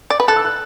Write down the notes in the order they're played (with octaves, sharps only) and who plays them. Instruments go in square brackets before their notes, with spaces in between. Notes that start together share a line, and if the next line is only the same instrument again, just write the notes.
[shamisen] D5
B4
[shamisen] A4 [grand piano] F#6
[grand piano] E6
F#6